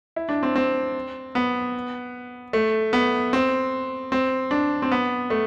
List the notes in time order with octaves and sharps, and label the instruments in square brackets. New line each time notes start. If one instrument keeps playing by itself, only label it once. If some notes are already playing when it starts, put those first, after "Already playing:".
[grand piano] E4
D4
C4
C4
B3
A3
B3
C4
C4
D4
C4
B3
A3